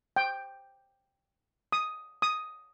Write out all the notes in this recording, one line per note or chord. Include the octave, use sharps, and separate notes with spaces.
G5
D#6
D#6